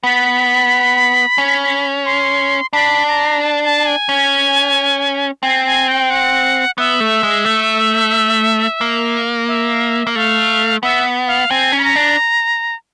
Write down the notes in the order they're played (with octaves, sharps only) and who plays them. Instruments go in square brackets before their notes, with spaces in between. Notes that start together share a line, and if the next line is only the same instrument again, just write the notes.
[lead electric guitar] B3 [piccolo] B5
[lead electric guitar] C#4
[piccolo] C6
[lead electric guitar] D4 [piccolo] B5
[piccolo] A#5
A5
A5
G#5
[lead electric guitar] C#4
[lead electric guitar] C4 [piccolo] G#5
[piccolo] G#5
G5
F#5
[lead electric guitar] B3 [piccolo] E5
[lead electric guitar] A3
G#3
A3
A#3
[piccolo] E5
[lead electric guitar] A#3
[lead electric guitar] A3 [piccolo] F5
[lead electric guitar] B3 [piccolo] E5
[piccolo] F5
[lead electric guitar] C4 [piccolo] G#5
[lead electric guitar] C#4
[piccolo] B5
A#5
[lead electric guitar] D4